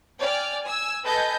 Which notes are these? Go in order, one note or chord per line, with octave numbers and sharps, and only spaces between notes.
D5 G5 G#5 F6
G#5 E6
A4 B4 D#5 G#5 G6